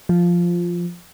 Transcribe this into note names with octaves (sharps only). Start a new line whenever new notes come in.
F3